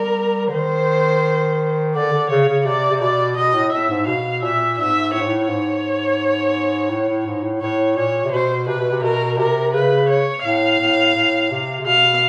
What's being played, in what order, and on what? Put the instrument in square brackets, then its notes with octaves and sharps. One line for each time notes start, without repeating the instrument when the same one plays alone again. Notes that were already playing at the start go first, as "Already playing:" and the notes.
Already playing: [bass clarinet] G3 [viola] A#4
[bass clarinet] D3
[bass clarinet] D#3 [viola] C5
[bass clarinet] D3 [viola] D5
[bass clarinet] D3
[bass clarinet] C#3 [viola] C#5
[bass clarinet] C#3
[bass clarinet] C3 [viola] D5
[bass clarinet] C3
[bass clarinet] B2 [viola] D5
[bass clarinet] B2 [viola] D#5
[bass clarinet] A2
[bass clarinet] A2 [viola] E5
[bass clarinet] G#2
[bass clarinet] B2 [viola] F5
[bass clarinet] A#2 [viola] E5
[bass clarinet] G#2 [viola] E5
[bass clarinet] A2 [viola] C#5
[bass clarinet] G#2
A2
[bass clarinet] G#2 [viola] C#5
[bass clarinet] A2
A2
G#2
A2
[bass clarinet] A2 [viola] C#5
[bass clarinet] A#2 [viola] C#5
[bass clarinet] C3
[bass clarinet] B2 [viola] C5
[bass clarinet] C3 [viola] B4
[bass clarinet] B2
C3
[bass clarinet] B2 [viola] A#4
[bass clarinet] C3 [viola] A#4
[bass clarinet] C#3 [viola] B4
[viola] C#5
[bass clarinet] A2 [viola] F5
[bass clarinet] A2
A2
C3
C3
[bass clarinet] B2 [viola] F5